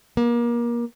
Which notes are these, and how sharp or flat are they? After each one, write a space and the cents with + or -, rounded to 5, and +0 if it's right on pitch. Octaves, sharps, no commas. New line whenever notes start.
A#3 +30